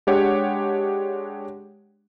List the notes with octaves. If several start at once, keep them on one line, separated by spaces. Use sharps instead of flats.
G#3 D4 G4 C#5 F#5